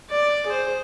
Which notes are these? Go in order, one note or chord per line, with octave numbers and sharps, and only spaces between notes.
D5
G#4 C5